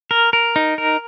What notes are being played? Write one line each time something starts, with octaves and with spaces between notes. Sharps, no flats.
A#4
A#4
D#4
A#4